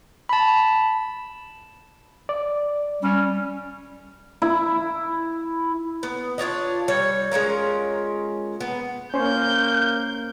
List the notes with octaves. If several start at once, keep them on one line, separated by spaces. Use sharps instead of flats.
A5 B5
D5
G3 C#4
E4
B3
D4 F4 C#5 D#5
G3 C#5
G#3 C#4 F4 A#4
B3
A#3 C#4 C5 C#5 G6